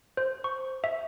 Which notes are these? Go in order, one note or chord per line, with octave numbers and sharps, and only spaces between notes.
C5
C#6
E5